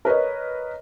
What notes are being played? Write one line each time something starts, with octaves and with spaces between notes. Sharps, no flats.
A#4 B4 C#5 D#5